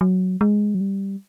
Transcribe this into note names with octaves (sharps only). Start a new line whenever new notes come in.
F#3
G#3
F#3
G3